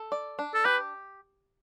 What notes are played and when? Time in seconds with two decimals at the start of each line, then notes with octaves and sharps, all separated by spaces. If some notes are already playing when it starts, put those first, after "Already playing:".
Already playing: A4
0.12 D5
0.39 D4
0.54 A4
0.65 G4 B4